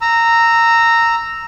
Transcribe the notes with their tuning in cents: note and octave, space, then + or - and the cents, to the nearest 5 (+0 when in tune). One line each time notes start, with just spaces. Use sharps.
A#5 -10 E6 +0